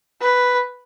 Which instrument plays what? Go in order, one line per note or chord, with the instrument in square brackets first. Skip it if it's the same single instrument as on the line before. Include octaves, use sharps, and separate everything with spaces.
[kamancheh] B4